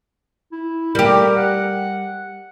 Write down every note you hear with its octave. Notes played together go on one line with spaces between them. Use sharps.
E4
G3 G4 A#4
F#5